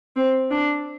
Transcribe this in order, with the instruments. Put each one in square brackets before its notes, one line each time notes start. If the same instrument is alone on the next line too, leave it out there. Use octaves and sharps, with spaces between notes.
[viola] C4
D4